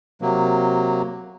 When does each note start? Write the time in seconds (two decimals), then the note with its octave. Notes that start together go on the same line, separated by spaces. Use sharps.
0.22 C3 F#3 A#3